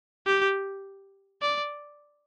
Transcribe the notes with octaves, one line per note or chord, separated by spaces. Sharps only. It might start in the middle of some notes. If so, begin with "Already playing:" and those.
G4
D5